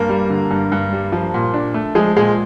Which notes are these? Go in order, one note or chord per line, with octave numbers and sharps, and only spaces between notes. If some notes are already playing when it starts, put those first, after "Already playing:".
Already playing: G2 A#3 A#4
G3
D3
G2
G2
G3
F3
A#2
D4
A3
F3 G#3 G#4
A#2 G#3 G#4